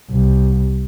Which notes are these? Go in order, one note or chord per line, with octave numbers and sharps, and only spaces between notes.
C2